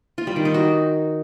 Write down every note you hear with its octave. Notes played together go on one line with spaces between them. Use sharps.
F4
G3
D#3
D#4
F#4